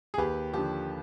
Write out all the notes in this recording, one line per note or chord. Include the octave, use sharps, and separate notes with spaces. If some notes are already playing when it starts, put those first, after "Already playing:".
G#4
D#2 G4 B4
D3 F3 G4